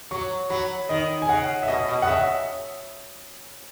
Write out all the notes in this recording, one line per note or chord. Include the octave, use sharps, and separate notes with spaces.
F#3 C#6
F#3 B5
D#3 D#5
G#5
C#3 F#5
E5
B2 D#5
B2
F#5
C#3 E5